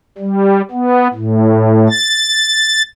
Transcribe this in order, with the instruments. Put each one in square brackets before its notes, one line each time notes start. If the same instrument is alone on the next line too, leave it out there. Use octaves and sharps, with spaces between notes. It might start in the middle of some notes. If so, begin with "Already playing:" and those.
[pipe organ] G3
B3
A2
A6